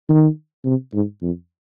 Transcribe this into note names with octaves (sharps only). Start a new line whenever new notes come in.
D#3
C3
G#2
F2